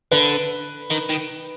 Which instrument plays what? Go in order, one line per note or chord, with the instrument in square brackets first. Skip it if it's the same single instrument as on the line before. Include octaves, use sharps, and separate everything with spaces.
[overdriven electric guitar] D3 [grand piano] B4
[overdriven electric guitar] D#3
D#3